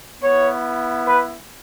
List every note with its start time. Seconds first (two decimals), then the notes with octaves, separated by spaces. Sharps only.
0.22 B3 E4 C#5
1.05 B4